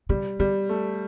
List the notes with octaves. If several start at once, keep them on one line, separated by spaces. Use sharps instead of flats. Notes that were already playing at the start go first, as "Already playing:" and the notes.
C#3 G3
D3 G3
A3